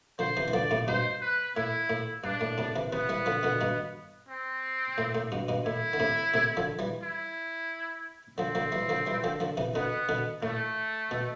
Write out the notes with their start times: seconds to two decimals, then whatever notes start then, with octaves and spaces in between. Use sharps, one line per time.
0.19 D3 F3 C5
0.37 C3 E3
0.48 E3
0.53 D3 F3 D5
0.71 A2 C3
0.87 G2 B2 C5
1.21 B4
1.56 A2 E4
1.90 A2
2.24 G2 D4
2.41 A2
2.58 A2 C3
2.76 C3 E3
2.92 C3 E3 B3
3.09 E3 G3
3.26 D3 F3
3.43 B2 D3
3.61 G2 B2
4.29 C4
4.98 A2
5.15 A2
5.32 G2 B2
5.48 G2 B2
5.66 A2 E4
5.93 D3
6.00 A2 C3
6.34 A2 C3
6.57 D3 F3
6.79 E3 G3
7.03 E4
8.38 D3 F3 C4
8.55 D3 F3
8.72 E3 G3
8.89 D3 F3
9.07 E3 G3
9.24 D3 F3
9.40 D3 F3
9.57 C3 E3
9.74 B2 D3 B3
10.09 B2 D3
10.43 A2 A3
11.11 B2